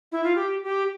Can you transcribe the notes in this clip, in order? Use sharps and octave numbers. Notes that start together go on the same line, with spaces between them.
E4
F4
G4
G4